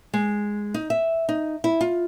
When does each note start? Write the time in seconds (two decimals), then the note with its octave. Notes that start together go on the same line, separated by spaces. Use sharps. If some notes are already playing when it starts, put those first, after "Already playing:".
0.14 G#3
0.74 D#4
0.90 E5
1.29 D#4
1.64 E4
1.81 F4